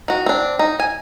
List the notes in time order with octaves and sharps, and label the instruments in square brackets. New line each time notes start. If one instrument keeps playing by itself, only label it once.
[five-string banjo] D#3 F#4
C4 D4
D#4
G#5